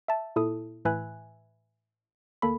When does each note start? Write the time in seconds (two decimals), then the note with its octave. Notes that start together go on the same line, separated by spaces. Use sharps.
0.08 E5 A5
0.36 A#2 E4 A4 D#6
0.85 A2 E3 B4 E5 G#5 F#6
2.42 D2 A#3 A4 B5